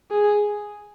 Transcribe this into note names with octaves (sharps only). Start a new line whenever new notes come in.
G#4